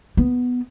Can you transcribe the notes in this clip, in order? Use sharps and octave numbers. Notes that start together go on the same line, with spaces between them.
B3